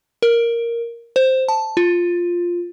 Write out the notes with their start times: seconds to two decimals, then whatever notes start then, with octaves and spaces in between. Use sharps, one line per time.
0.22 A#4
1.16 C5
1.48 A5
1.77 F4